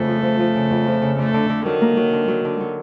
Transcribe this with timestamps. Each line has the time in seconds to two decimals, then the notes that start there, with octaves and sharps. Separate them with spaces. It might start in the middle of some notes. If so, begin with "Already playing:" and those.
Already playing: F2 C#3 A3
0.08 F3
0.23 F3
0.39 F3
0.55 C#3
0.71 F2
0.87 F3
1.02 C#3
1.18 D3 A3
1.34 D3
1.49 D3
1.66 D#3 F#3
1.81 A#3
1.97 F#3
2.13 D3
2.28 F#3
2.45 D3
2.60 F#3